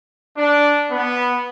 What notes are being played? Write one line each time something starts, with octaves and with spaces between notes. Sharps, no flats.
D4
B3